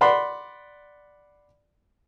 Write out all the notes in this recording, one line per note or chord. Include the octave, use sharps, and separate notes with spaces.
D5 F#5 B5 C6